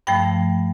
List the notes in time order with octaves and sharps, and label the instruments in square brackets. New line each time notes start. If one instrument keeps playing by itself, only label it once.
[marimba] G2 F3 A3 G5